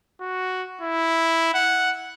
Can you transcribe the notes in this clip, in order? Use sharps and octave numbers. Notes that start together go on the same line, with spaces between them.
F#4
E4
F#5